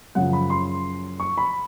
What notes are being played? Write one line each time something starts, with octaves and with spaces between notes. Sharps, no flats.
F#2 C#3 F3 F#5
B5
C6
C#6
B5